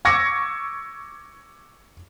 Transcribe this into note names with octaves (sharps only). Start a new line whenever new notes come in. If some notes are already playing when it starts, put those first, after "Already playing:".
C#6 D6 E6 G#6 A#6 C#7